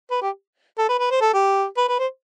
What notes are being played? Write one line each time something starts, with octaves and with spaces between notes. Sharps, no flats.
B4
G4
A4
B4
B4
C5
A4
G4
B4
B4
C5